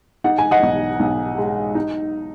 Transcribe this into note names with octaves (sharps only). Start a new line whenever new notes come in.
D#4 F#5
G#5
D#5 F#5
B1
B1
G#3
D#4